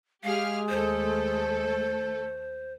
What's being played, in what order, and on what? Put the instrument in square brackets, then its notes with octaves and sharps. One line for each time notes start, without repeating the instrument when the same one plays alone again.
[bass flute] G#3 [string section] G4 G#4 F6 [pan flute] F5
[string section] D#2 A3 A4 [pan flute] C5